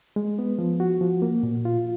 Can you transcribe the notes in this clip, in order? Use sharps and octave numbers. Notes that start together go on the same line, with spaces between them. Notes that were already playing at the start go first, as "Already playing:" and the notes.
G#3
B3
F3
F#4
F3
A#3
A#2
F4